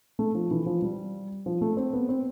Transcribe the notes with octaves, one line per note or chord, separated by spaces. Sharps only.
A3
F3
E3
F3
G3
F3
A3
C4
B3
C4